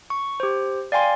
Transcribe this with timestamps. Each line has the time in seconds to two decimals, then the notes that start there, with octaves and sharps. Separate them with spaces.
0.10 C#6
0.40 G4 C5
0.92 D5 F5 G5 G#5 C6